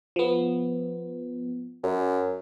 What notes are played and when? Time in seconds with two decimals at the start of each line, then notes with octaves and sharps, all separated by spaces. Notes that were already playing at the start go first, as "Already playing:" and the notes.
0.16 F3 B3
1.83 F#2